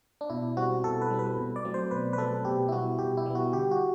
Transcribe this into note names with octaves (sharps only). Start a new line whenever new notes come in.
D4
B2 E4
G3 C4 F#4
B2 A4
B4
G3 C4
B4
B2
D5
F#3 A3 C4
C5
B2 B4
B4
F#3 A3 C4 A4
B2 G4
E4
G3 B3 F#4
B2 G4
E4
G3 B3
F#4
D3 G4
F#4